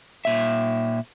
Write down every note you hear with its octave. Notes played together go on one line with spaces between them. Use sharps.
A#2 E5